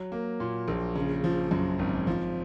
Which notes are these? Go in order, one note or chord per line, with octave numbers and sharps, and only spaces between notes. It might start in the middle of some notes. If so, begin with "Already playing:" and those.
Already playing: F#3
A#3
A#2
A#1
C#3
F3
F#2
G#1
F3